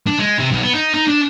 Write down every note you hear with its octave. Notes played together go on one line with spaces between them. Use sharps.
D4
G#3
C3
B1
B3
D#4
D#4
D4